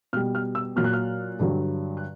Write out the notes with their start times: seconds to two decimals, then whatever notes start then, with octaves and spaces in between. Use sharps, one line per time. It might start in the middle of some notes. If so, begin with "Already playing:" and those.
0.13 B2 F6
0.16 G3
0.35 F6
0.55 E6
0.76 A#2 F#3 F6
0.84 F#6
0.93 F6
1.39 G2 D3 F#3
1.97 F#6